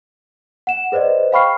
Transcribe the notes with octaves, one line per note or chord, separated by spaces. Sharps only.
F#5 E7
G#4 B4 C5 D5 D#5
F5 G5 B5 C#6 F6 C7